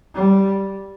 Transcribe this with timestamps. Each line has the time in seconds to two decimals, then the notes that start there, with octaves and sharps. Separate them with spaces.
0.15 G3